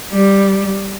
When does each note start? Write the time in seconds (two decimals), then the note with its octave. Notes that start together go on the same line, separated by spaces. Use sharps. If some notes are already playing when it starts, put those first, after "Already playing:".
0.11 G3